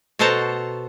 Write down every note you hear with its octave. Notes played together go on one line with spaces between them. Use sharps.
B2 F#4 A4 C5 A5 A#5